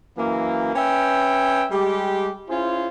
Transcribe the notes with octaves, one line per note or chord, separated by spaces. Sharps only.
F#2 E3 A#3
C#4 B4 E5 G5
G3 G#3 G4
C#4 E4 F4 G#4 C5